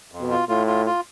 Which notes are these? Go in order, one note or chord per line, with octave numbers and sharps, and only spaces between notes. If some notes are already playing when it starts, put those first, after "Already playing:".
F2
B2
F4
A2 F4
F4
F4